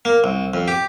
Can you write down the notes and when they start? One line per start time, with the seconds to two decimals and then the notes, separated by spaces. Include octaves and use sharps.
0.05 A#3
0.24 C2
0.54 F2
0.68 G4